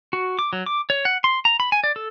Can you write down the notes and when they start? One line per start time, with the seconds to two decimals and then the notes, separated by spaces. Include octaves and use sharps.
0.13 F#4
0.39 D6
0.53 F#3
0.66 D6
0.90 C#5
1.05 F#5
1.24 C6
1.45 A#5
1.60 B5
1.72 G#5
1.84 D5
1.96 A4